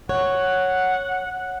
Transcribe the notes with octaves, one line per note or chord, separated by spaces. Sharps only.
C#5 F#5